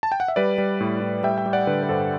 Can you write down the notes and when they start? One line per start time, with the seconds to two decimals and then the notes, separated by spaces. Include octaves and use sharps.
0.03 A5
0.12 G5
0.20 F#5
0.28 E5
0.36 G3 B4 D5
0.58 G3
0.81 A2
1.02 A2
1.23 G3 E5 G5
1.38 E5 G5
1.46 G3
1.53 D5 F#5
1.67 D3 B4
1.83 B4
1.89 G2 A4 C5